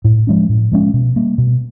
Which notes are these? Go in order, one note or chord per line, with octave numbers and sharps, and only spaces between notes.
A2
F3 G#3 C#4
A2
F3 G#3 C#4
B2
G3 A#3
B2